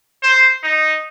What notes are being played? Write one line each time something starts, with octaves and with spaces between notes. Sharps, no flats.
C5
D#4